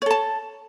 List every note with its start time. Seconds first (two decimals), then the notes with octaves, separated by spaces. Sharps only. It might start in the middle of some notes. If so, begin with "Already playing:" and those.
0.02 C#5
0.06 A4
0.11 A5